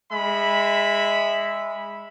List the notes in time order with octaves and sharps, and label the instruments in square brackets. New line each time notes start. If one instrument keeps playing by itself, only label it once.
[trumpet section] G#3 E5 B5